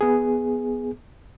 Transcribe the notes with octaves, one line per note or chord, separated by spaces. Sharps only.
B3 G#4